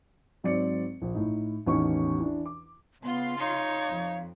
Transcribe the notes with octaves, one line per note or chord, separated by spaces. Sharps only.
G#2 F#3 C4 D5 C#7
A#1
A2 D#4
A1 E2 D#3 C#4 D#4 C#6
E3 D4
D6
C#3 B3 F4 C6
D#4 C#5 F5
F2